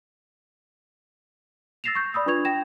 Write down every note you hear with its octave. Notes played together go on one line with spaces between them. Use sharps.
E6 A6 A#6 C7 E7 F7
C#6 G6
D5 B5 D#6 E6
D4 F4 B4 C#6 G#6 F7
G5 A#6 E7